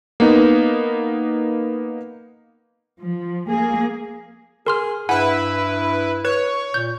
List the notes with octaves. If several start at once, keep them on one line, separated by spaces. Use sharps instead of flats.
A#3 B3 D#4
F3
A#3 G#4
G#4 A#4 C6 F6
G2 E4 B4 F#5 G#5
B4 C#5
A#2 G6